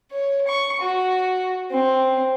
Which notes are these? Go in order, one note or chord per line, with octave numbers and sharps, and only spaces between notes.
C#5
C#6
F#4
C4